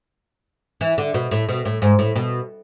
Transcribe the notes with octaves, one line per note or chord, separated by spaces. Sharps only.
E3
D3
B2
A2
B2
A2
G#2
A2
B2